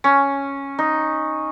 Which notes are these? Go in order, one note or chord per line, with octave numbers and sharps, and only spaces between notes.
C#4
D#4